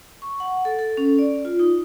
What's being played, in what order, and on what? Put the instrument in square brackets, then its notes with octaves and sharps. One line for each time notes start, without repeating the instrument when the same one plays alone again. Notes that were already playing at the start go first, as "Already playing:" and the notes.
[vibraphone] C#6
F#5
A4
A4
C#4
D5
F4
D#4